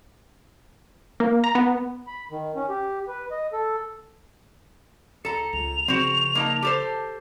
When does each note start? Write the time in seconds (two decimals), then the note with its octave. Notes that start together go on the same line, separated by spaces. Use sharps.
1.20 A#3
1.44 A#5
1.55 B3
2.07 B5
2.31 D#3
2.56 C#4
2.69 G4
3.08 B4
3.31 D#5
3.53 A4
5.25 C#2 A4 A#5 C#7
5.53 C#2 F7
5.88 C#3 F3 C4 F#4
6.35 A#3 D#4 A5
6.62 G4 A4 C5